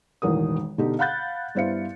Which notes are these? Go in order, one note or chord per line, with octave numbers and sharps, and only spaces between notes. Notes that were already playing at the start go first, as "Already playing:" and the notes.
E1 A1 D#3 A#4 D#6
B2 D3 D4 D#4 G4
F5 F#5 B5 F#6 G6 A6
G2 B3 E4 C5 F5 C#7